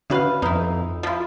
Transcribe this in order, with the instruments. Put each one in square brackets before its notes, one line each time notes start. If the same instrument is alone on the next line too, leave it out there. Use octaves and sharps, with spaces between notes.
[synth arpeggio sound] D3 C#4 F#4 [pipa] E4 B4 F5
[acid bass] F2 [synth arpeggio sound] B3 [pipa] D#4 E4
[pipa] F3 E4 [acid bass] F4